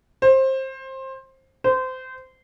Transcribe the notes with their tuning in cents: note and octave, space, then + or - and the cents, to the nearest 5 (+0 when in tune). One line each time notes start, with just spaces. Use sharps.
C5 +20
C5 -25